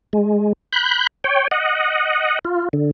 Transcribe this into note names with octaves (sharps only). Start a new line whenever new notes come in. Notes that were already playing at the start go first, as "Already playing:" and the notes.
G#3
B5 F#6 G6
C#5 G5
D#5 F#5
F4
D3